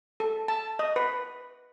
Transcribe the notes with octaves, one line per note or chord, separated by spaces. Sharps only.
A4
A5
D#5
B4